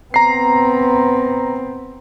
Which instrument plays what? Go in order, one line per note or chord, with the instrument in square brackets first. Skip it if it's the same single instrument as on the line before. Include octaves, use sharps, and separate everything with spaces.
[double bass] B3 C4 [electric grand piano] A#5 C7